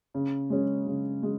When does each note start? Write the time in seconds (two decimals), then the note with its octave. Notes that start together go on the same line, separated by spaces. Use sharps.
0.14 C#3
0.50 G#3 C#4
0.87 C#3
1.23 G#3